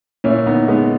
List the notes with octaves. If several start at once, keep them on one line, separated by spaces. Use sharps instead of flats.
A#2 C#4 E4
B3 D#4
G#3 B3